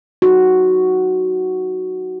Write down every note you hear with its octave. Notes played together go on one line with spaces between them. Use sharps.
D#4 F#4